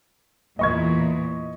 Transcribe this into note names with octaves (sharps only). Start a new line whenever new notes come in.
E2 A#2 E3 D#5 C#6 G#6